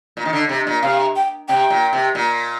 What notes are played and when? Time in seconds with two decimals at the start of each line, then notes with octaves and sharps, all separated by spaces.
0.17 A#2
0.25 D#3
0.33 D3
0.49 C3
0.67 A#2
0.82 C3 F5
1.16 G5
1.48 C3 G5
1.70 A#2
1.93 C3
2.15 A#2